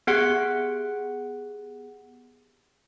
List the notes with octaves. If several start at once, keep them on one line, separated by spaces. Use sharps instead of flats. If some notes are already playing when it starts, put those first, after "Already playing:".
B3 G4 G#4 F#5 F#6 C#7